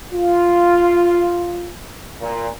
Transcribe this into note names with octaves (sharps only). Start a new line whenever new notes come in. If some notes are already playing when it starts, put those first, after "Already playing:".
F4
A#2